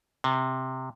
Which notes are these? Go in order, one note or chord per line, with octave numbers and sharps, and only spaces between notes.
C3